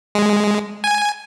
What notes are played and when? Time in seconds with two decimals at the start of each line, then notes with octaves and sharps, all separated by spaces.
0.15 G#3
0.84 G#5